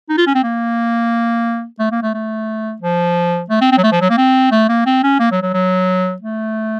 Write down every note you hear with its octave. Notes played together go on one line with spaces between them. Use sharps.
D#4
F4
C#4
C4
A#3
A3
A#3
A3
A3
F3
A3
C4
C4
F#3
A3
F3
F#3
A#3
C4
A3
A#3
C4
C#4
A#3
F#3
F#3
F#3
A3